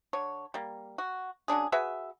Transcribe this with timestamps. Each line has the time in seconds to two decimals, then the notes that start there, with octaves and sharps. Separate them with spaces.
0.13 D3 C#5
0.54 G3 A#3
0.98 F#4
1.48 F#3 C#4 D4 G#4
1.72 F#4 G#4 B4 E5